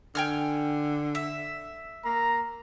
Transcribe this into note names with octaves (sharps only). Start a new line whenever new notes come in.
D3 G5 G#5 F6
E5
A#3 A#5